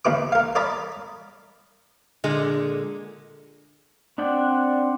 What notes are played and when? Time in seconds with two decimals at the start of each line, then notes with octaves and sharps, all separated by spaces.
0.05 D#2 D#3 B4 D6
0.32 A#4 F5
0.55 A#4 D5 D#5 A5 B5
2.24 A#2 D3 G#3
4.18 C4 D4 D5 F#5 G5